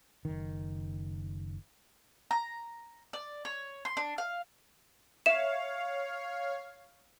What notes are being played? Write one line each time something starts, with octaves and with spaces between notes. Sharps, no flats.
F#1 D#3
A#5
D5
C#5
C6
D4
F5
C#5 E5 F5 E7